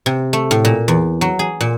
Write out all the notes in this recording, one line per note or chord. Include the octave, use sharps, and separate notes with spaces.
C3
A3
A2
A#2
E2
F#3
G#4
A#2